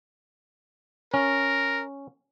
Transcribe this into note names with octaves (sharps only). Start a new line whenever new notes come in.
C#4 A#4